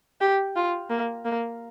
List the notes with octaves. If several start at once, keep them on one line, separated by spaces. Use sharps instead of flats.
G4
F4
A#3
A#3